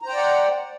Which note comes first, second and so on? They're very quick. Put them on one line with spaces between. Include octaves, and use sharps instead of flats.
A#5 C5 G5 D5 F#5